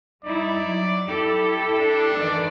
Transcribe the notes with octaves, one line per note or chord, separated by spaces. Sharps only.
G3 D#4 E4 D5
F#3
E4 G4 A4
D4
D#3 E3 D5